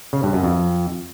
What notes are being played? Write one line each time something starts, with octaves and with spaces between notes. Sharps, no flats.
C#3
G2
F#2
F2